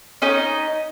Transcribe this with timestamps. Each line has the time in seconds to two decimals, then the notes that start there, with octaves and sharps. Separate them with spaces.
0.22 C#4 D#4 D#5